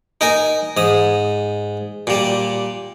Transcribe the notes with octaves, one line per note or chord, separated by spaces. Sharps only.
D#4 A#4 G#5
G#2 D#6
A#2 G3